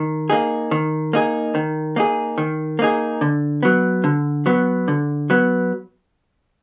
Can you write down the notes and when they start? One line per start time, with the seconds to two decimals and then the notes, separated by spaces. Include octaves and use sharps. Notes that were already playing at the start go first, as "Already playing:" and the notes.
Already playing: D#3
0.30 A#3 D#4 G#4
0.71 D#3
1.13 A#3 D#4 G#4
1.55 D#3
1.96 A#3 D#4 G#4
2.38 D#3
2.79 A#3 D#4 G#4
3.21 D3
3.63 F#3 B3
4.04 D3
4.46 F#3 B3
4.88 D3
5.30 F#3 B3